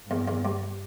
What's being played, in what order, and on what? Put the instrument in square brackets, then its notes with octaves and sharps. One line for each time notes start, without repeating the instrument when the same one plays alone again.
[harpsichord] E2 [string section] G2
[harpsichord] E2
G2